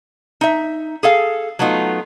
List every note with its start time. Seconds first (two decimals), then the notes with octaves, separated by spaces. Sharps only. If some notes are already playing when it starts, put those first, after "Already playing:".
0.41 D#4 E5
1.03 G#4 A4 F5
1.59 F#3 A3 B3 D#4 F4